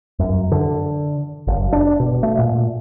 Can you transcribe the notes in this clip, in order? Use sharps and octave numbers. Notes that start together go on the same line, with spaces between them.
F#2
D3
F#1
D4
B2
A3
A#2